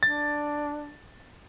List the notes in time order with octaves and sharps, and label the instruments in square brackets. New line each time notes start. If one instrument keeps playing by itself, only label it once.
[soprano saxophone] D4 [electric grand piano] A6